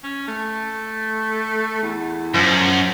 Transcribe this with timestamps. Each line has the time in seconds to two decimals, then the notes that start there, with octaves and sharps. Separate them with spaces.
0.04 C#4
0.28 A3
1.82 E2
2.34 F#2 F3